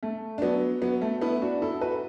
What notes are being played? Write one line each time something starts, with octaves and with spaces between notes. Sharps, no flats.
A3
D4
F#3 B3
F#3 B3
A3
B3 E4
D4 F#4
E4 A4
F#4 B4